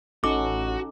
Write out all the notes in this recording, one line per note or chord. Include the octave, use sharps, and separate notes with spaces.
A1 C#4 D#4 F#4 A4 D6